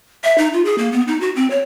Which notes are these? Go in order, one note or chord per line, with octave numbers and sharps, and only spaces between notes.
E5
D#4
F4
G#4
A#3
B3
D#4
F#4
C4
C#5